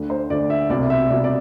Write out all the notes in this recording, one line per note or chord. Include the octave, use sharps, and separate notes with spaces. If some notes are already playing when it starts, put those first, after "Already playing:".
Already playing: D2 D3
C5
D2 D3 D5
E5
C2 B2 D5
E5
C2 B2 D5
D5